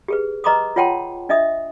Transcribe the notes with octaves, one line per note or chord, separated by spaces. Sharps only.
G4 G#4 B4
B4 D#5 A#5 C6 D6 D#6
F4 C#5 F#5 G5 A5 C6
D4 D#5 E5 D#6